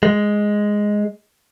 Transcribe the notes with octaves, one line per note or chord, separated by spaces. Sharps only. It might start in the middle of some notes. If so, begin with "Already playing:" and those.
G#3